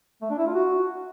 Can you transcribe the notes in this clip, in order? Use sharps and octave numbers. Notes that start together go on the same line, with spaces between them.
A3
D4
E4
F4
F#4